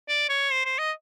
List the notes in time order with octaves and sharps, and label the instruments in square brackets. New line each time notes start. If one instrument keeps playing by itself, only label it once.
[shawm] D5
C#5
C5
C5
D#5